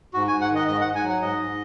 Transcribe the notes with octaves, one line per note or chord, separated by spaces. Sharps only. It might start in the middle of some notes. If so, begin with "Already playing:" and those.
G#2 F#4
G#5
G#2
F#5
D#3 D#5
G#2 D#5
F#5
G#2
G#5
F#3
F#5
G#2 D#5
G#2